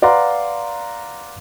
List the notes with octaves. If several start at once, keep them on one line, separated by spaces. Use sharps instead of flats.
B4 D5 F5 F#5 A#5 C6